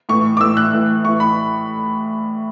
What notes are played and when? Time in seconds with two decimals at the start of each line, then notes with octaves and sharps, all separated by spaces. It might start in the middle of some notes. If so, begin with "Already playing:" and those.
0.09 A2 E3 C#6
0.37 D6
0.41 A2 E3 E6
0.57 F#6
0.73 A2 E3
1.04 A2 E3 C#6
1.20 B5